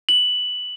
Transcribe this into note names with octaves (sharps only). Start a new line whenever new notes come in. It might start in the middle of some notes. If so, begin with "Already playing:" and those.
F#7